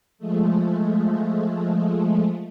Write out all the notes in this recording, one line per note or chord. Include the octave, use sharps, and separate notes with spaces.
F3 G#3 A3